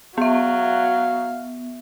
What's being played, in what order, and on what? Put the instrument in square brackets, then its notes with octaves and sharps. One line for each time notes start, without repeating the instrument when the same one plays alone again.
[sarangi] F#3 [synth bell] B3 E5 [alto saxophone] F5